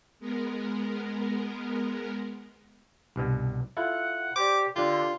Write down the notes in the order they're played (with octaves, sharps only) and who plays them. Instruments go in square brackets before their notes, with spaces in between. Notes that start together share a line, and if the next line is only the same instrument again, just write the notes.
[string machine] G#3 B3 A#4
[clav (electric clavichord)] C2 G2 B2
[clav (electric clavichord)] E4 F4 A4 [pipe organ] F#5
[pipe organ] G4 [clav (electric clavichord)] C5 D5 [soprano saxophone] D6
[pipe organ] D3 [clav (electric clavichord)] D4 G4 [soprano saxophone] F4